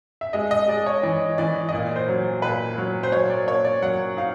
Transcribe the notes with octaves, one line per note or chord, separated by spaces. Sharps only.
E5
G#3 D#5
D#5
G#3 D5
C#5
E3 D5
E3 D5
D#5
A#2 D5
C5
F#3
A#2 B4
F#3
C5
F#3 C#5
D5
A#3 C#5
D5
F#3 F#5
D#4 F5